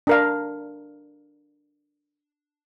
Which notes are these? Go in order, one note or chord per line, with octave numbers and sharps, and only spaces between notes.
D4 A#4 F5